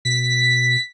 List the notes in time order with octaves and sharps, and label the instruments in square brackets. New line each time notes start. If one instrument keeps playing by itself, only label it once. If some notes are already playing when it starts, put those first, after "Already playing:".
[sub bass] B2 [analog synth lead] B6